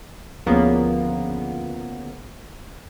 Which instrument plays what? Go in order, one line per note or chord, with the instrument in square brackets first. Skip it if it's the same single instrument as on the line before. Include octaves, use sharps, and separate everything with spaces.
[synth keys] D2 C#3 F3 A#3 B3